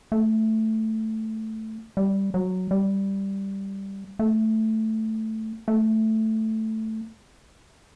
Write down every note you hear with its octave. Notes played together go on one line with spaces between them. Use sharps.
A3
G3
F#3
G3
A3
A3